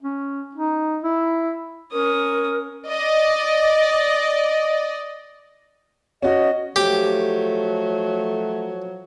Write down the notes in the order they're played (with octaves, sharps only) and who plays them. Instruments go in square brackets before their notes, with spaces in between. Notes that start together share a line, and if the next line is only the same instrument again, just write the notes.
[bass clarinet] C#4
D#4
E4
[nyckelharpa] C#4 D#6 [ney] A#4
[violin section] D5 D#5
[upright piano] C#4 F#4 [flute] D#5
[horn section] F3 F#3 [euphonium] A3 [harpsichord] G4